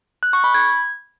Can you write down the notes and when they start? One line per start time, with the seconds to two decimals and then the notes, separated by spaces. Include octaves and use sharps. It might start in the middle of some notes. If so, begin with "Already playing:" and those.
0.23 F#6
0.33 C#6
0.44 B5
0.54 G#6